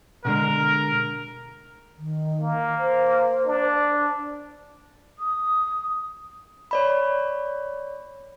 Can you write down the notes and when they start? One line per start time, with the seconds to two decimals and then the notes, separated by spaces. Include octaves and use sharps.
0.25 B2 D3 G#3 A#4
1.98 D#3
2.42 A#3
2.79 C5
3.47 D4
5.18 D#6
6.71 C#5 D5 B5